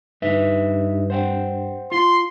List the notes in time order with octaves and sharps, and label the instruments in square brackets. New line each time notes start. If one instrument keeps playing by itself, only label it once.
[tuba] G2 [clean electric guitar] D#4 B4 E5
[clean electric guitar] C5 F#5 G5
[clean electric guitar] F4 [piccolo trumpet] C6